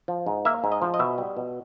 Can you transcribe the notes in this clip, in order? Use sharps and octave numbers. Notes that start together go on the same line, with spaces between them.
F3
G#2
A#3 E5
G#2
D#5
F3
D#5
B2 E5
G3
B2